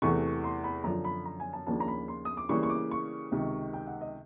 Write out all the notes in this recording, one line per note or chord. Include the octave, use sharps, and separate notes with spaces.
E2 C3 E3 A3 C#6
C6
B5
F#2 D3 F3 A#5
B5
A#5
G#5
A5
D#2 C#3 F3 A#3 D4 A5
A#5
B5
C6
D#6
D6
C#3 E3 G3 A#3 C#6
C#6
D6
C#6
C#2 C3 D#3
G5
F#5
D#5